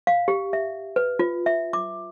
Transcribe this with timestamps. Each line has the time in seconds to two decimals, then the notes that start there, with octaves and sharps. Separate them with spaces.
0.07 F5
0.28 G4
0.53 E5
0.96 B4
1.19 F4
1.46 E5
1.73 D6